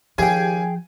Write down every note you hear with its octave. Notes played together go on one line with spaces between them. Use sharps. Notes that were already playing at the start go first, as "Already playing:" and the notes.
D#2 F3 G4 G#4 G5 G#5